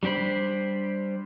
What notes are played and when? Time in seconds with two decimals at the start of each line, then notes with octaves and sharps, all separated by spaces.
0.03 G3 D4 G4 C5 B5